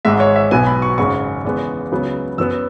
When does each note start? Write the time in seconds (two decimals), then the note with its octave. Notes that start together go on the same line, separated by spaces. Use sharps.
0.05 G#1 G#2 G#3 E5
0.20 C#5
0.36 E5
0.51 B1 B2 F#3 B3 G#5
0.67 B5
0.82 C#6
0.98 G#1 F#2 C#3 G#3 C#6
1.45 E2 C#3 G#3 B3
1.91 C#2 C#3 F#3 B3
2.38 F#2 F#3 B3 E6